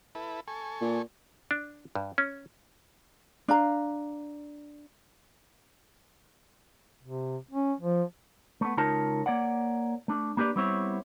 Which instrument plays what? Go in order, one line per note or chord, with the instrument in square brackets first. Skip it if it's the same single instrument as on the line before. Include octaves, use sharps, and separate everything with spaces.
[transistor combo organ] E4 A4 B4
A4 G#5 C#6
[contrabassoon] A#2
[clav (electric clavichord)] D4
G2
C#4
[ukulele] D4 F5 A#5
[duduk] C3
C#4
F3
[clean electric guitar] A3 B3
C#2 D#4 F4 A#4 C#5 A5
A#3 C#5 D5 F#5
A3 D4
A#3 D4 G4 B4 D5
G3 B3 C4 E4 C#5